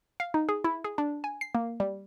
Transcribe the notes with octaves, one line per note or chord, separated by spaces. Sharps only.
F5
D#4
G#4
E4
G#4
D4
G#5
C7
A#3
G3